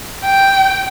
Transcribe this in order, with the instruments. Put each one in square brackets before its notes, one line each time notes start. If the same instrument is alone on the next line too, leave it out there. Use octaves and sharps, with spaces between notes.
[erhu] G5